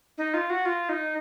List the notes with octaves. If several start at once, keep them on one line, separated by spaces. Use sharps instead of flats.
D#4
F4
F#4
F4
D#4